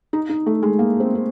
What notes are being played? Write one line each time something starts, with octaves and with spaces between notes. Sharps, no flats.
D#4
D#4
A3
G#3
A#3
C4
C4